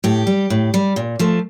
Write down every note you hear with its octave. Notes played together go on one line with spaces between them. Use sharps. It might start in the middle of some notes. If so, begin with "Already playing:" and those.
A2 G4
G3
A2
G3
A#2
F3 A3